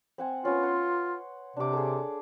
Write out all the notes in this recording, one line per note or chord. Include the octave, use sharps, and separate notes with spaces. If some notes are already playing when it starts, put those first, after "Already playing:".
C4 F#5 G#5
B3 C#4 F4
F#5 C6
C3 D4 D6
G#4 A4